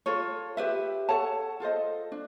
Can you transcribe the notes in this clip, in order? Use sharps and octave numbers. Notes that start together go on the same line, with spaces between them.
F4 A4 C#5
G4 B4 E5
A4 C#5 F#5 A5
F4 A4 C5 D#5
D4